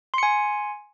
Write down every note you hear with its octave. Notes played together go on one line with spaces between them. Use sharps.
G#5 C6 C#7